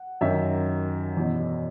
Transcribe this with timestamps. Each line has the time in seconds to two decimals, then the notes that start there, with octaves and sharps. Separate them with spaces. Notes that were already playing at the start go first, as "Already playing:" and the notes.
Already playing: F#5
0.21 F#2 D#3 E5
1.17 E2 B2